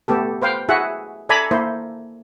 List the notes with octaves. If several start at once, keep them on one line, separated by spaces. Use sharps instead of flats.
A3 B3 G4 A4
B4 C5 F5 G5
E4 F#4 G#4 E5 F#5
A4 D5 E5 G#5 A#5 B5
A#3 E4 C5